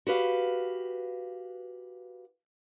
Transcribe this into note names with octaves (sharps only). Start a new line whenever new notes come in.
F#4 G4 B4 F5